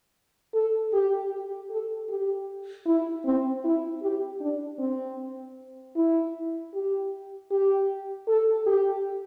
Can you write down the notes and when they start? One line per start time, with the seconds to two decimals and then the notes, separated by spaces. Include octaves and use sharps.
0.54 A4
0.93 G4
1.32 G4
1.71 A4
2.09 G4
2.86 E4
3.25 C4
3.64 E4
4.02 G4
4.41 D4
4.79 C4
5.96 E4
6.74 G4
7.51 G4
8.28 A4
8.67 G4